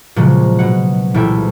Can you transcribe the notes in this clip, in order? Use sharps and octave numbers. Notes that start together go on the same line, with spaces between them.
A#2 C#3 F3 F#3 G#3
B2 F#5
C2 A#2 E3 E4 A4 G5